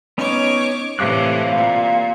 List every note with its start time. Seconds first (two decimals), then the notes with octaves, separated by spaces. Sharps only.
0.18 B3 C#4 D#4 C#5 D6
0.99 A2 C3 E3 F5 D6 F#6
1.53 A#2 F5